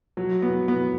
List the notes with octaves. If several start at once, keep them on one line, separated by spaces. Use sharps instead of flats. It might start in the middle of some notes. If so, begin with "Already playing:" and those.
F#3
B3
B3